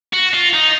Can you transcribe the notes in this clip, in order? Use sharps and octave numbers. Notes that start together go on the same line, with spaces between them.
F#4
F4
D#4